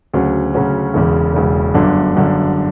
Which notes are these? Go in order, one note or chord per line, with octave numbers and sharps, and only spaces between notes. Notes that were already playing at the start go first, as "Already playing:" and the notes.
D2 C#3 F#3 C#4 F#4
D2 C#3 F#3 C#4 F#4
E1 E2 C#3
E1 E2 C#3
G1 F#2 D3
G1 F#2 D3